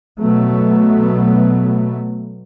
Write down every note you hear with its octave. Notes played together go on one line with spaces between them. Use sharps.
B2 F#3 A3 B3